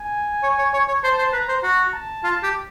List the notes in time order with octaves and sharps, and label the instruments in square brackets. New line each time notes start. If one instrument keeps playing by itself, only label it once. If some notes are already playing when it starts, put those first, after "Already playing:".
Already playing: [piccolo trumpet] G#5
[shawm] C#5
C#5
C#5
C#5
[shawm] C5 [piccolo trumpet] A5
[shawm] C5
[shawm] B4 [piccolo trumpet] A#5
[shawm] C5
[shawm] F#4 [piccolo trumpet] A#5
[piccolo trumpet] A5
[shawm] F4 [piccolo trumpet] A5
[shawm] G4